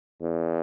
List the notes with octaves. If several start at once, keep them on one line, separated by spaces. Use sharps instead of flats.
E2